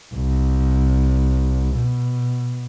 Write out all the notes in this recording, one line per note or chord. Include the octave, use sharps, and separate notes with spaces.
C2
B2